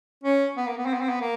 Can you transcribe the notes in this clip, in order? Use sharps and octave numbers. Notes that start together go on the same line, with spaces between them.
C#4
B3
A#3
B3
C4
B3
C4
B3
A#3